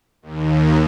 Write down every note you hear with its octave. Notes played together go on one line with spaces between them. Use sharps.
D#2